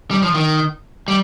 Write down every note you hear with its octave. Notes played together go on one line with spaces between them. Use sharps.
G3
F3
D#3
G3